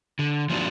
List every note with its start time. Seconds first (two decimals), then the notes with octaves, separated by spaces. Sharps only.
0.19 D3
0.49 F3 A#3 D4 F#4